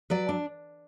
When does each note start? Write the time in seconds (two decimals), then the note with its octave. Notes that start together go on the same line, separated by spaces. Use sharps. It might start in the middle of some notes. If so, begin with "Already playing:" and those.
0.10 F#3 B4 D5
0.29 D4